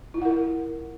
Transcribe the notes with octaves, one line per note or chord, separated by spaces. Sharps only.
E4 F4 A#4 F#5